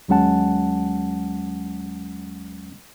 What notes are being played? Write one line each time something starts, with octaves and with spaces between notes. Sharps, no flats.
D#2 F#3 G#3 C#4 F#5 A5